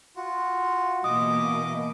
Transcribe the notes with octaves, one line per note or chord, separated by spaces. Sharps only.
F4 F#4
B2 E3 A#3 D#5 D6 D#6